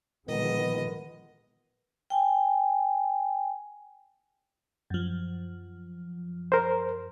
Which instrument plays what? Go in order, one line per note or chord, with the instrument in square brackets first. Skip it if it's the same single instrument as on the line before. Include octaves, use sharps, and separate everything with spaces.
[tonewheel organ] A#2 D#3 [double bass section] D3 F3 G#3 [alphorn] B3 [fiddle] D#5
[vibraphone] G5 G#5
[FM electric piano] F#2 F3
[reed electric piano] A#4 C5